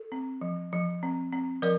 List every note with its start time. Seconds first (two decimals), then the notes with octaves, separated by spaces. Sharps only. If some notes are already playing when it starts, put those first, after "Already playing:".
Already playing: A4
0.12 C4
0.41 F3
0.73 F3
1.03 C4
1.33 C4
1.62 F3 A#4 D5